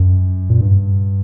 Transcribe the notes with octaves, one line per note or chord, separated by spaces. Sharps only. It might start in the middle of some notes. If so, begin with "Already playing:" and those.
Already playing: F#2
A#2
G2